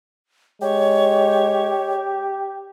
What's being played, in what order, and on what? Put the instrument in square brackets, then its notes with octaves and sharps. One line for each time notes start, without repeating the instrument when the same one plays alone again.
[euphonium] G#3 [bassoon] G4 [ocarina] C#5